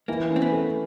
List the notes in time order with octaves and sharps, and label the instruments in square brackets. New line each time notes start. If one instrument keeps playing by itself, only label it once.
[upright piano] E3 [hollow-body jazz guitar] A#3
[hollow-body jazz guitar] C4 [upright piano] C#4
[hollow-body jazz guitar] B3
[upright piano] A3